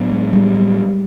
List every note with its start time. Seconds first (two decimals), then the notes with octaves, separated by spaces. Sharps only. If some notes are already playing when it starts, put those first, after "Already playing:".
Already playing: A2 F#3 B3 D4
0.11 G#3
0.33 G3
0.55 G3